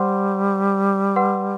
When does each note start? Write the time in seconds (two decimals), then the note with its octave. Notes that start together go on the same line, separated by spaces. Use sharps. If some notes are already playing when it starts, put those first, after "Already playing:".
Already playing: G3 C5 F#5 C6
1.16 B4 F#5 C6